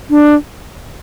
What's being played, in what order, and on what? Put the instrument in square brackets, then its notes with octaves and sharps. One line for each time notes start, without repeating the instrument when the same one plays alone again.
[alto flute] D4